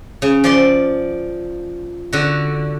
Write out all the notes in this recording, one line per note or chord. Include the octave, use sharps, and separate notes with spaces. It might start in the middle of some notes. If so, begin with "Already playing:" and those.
C#3
F3 D5 C6
D3 F#4